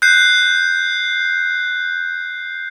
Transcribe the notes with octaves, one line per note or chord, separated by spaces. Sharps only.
F#6 G6 C7